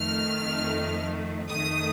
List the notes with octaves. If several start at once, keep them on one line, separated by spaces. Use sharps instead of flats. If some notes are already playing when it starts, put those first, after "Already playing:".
Already playing: F2 D#3 A3 F6
F2 D#3 A3 D#6